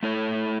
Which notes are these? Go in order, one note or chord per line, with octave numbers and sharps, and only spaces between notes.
A3 E4 A4 C#5